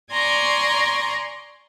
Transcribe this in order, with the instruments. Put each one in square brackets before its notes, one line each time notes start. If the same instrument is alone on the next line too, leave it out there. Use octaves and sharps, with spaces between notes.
[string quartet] D5 G#5 A#5 C6 C#6